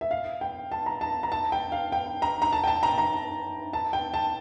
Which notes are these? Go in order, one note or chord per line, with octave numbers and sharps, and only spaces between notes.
E5
F5
G5
A5
A#5
A5
A#5
A5
G5
F5
G5
A#5
A#5
A5
G5
A5
A#5
A#5
A5
G5
A5